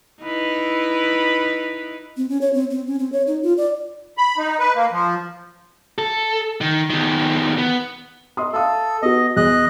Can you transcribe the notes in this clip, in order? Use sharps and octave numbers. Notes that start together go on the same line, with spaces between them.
D#4 E4 B4
C4
C#4
C#5
C4
C4
C#4
C4
C#5
D#4
F4
D5
B5
D#4
B4
A#3
F3
A4
D#3
E2 D#3
B3
D#5 C6 D#6
A4 E5 F5 D#6
B3 F#4 D#5
E2 D#5 F#6